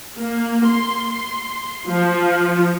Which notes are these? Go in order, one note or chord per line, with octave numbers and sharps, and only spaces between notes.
A#3
C6
F3